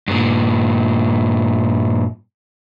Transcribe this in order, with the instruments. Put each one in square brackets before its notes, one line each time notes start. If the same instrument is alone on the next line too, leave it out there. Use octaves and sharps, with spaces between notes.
[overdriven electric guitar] G2 A#2